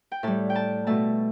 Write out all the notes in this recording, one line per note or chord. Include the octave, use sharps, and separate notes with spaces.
G5
A2 G3 A5
G5
A5
B2 A3 A5